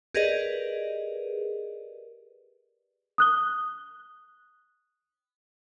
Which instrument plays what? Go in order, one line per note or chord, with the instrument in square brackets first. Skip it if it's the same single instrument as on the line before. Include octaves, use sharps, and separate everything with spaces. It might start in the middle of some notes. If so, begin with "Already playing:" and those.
[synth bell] G4 G#4 A#4 B4 D5 D#5
[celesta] D#6 F#6 G7